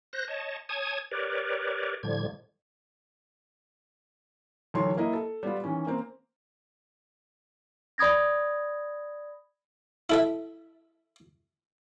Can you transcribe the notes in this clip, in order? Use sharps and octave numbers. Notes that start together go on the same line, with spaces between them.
C5 F#6 A#6
C#5 D#5 A5
C#5 G#5 A5 D#6 G#6
G4 A#4 B4 C#5 D5
A2 D3 F3 G3 G#6
D2 D#3 E3 F#3 C#5 C6
A#3 E4 D#5
A4
G3 B3 F4
D#3 E3 C#4
A#3 C4
D5 B5 D#6 G#6 A#6
E4 A4 E5